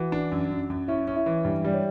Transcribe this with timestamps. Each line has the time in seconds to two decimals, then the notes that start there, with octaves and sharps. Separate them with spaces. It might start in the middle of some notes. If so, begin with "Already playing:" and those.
Already playing: E3 F#4 F#5
0.12 D4
0.32 F#2
0.51 F#2
0.70 F#2
0.88 C#4 E4 E5
1.08 C#4
1.16 E4 E5
1.26 E3
1.45 G2
1.64 G3 D5
1.74 C#5